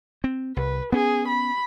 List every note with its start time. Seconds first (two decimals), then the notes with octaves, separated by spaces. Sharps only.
0.24 C4
0.57 C2 B4
0.92 B3 C#4 G#4
1.28 B5